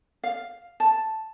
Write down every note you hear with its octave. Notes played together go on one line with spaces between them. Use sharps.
F5
A5